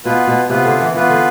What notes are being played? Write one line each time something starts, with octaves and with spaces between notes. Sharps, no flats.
B2 B3 F4 B4
B2
C3 B3 F4 B4
D3
E3
E3 B3 F4 B4
D3